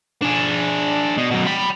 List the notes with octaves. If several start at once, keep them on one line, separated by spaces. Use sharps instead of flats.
D4 G#4
B2
F#2 B2
G5 B5